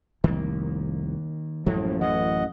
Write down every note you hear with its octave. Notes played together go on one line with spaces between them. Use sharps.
F1 C2 D#3 A#3
A1 F#2 A2 F3 G#3 A#3
E3 C#4 D#5 F#5